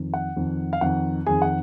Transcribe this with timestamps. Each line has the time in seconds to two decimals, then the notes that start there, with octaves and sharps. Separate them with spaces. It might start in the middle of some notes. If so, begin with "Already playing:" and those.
Already playing: F2 D#3
0.14 F#5
0.37 F2 D#3
0.73 F5
0.81 F2 D#3 F#5
1.27 F2 D#3 G#4 G#5
1.42 F#5